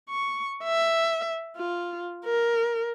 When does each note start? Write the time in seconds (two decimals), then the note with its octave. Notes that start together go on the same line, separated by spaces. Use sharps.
0.10 C#6
0.64 E5
1.57 F4
2.25 A#4